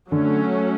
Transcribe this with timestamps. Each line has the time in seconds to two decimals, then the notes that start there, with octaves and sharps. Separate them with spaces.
0.11 D3 F#3 A3 C#4